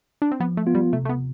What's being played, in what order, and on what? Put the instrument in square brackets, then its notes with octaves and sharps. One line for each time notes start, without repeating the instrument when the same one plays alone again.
[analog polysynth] D4
C4
[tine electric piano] F3 [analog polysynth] B3
[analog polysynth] A3
[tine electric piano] B3 F4
[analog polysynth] G3
[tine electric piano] C3 [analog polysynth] A3
[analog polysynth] A3
B3